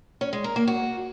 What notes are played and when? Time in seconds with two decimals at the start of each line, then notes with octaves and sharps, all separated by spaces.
0.21 C#4
0.33 G#3
0.44 A#4
0.56 A#3
0.67 F#4